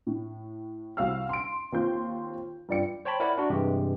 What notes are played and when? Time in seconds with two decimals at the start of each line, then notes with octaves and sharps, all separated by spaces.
0.07 A2
0.97 C2 F#4 F5 E6 F6
1.29 C6 D7
1.72 D#2 C4 F4 C6 G6
2.69 G2 F4 D5 G5 C#7
3.05 C5 C#5 G5 A5 B5
3.20 E4 A#4 D5 F#5 B5
3.38 D4 F#4
3.50 G2 C3 E3 G#3 G4